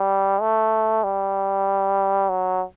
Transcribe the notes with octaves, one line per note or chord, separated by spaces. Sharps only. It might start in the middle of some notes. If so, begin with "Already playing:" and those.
Already playing: G3
A3
G3
F#3